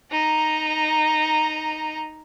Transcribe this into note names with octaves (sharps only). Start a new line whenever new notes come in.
D#4 A#5